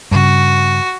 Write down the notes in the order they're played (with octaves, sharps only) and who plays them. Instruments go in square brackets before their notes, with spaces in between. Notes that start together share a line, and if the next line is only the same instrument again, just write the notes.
[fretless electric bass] G2 C#3 [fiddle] F#4